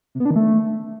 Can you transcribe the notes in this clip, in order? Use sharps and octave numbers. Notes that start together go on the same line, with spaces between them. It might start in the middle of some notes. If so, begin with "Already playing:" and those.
C3
B3
D4
D#3
A3